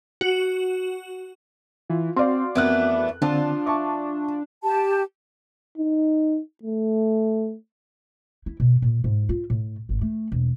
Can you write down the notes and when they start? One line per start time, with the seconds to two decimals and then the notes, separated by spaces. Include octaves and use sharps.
0.21 F#4
1.90 E3 F4
2.16 C4 F#4 D5 F5 C6
2.55 F2 E3 A3 B3 D4 A#4 F#6
3.22 D3 F3 C4 D4 F4 A5
3.66 E5 A5 C#6 D6
4.64 G4 A5
5.78 D#4
6.63 A3
8.46 E4
8.60 B2
8.82 A#2
9.04 G#2
9.29 F4
9.50 A2
9.89 G#1
10.01 A3
10.32 E1